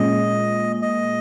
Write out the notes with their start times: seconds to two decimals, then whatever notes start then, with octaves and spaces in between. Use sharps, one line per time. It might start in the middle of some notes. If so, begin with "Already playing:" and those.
Already playing: A#2 G#3 C#4 D#5
0.82 D#5